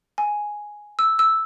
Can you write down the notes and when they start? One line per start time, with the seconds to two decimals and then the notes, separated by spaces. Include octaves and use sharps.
0.18 G#5
0.99 E6
1.19 E6